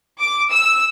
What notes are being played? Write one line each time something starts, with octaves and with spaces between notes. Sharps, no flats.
D6
E6